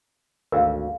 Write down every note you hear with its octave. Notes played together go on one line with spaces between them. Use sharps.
G#1 D2 A#4 F5